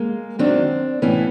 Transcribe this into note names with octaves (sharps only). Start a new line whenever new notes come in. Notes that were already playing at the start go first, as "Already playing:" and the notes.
Already playing: G#3 A#3
F#2 D#3 F#3 C4 D4
A2 E3 B3 C#4